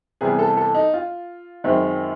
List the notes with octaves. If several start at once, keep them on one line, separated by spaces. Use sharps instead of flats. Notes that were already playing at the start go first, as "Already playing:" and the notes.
C3 E3 G3 B3 G#4
A4
A4
D#4
F4
F#2 D#3 G#3 C4